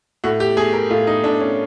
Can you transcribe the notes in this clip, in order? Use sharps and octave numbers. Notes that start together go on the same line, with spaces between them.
A2 F#4
G4
A3 G#4
A#4
A2 F4
D#4
A2 D4
C#4